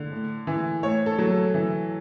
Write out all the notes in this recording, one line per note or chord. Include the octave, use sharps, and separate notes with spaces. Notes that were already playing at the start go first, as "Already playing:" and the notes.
Already playing: D3
A2
E3
A2 C#5
A4
F#3
A4
E3